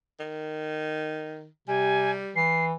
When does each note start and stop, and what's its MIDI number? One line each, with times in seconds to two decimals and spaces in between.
0.19 1.47 51
1.68 2.20 48
1.68 2.39 55
1.68 2.11 80
2.36 2.74 52
2.36 2.65 96